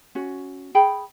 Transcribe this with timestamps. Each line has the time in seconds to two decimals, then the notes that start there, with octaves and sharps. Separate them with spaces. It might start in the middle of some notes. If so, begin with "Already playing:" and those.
0.15 C#4 F#4
0.75 G#4 G5 B5